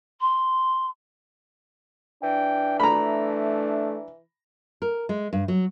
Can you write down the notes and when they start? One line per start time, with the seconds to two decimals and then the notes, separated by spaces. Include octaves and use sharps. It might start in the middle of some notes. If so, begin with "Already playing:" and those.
0.21 C6
2.23 E3 D4 G5
2.80 A3 A#5 B5
4.82 A#4
5.09 G#3
5.33 G2
5.48 F#3